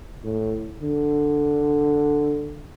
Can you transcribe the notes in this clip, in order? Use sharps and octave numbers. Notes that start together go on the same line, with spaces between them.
A2
D3